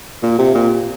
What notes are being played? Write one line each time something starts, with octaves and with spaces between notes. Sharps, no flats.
A#2
C3
A#2